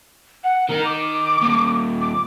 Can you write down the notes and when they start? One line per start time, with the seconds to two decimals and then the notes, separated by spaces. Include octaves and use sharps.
0.44 F#5
0.69 D#3 D#4 A#4
0.85 D6
1.41 D#2 A#2
2.01 D6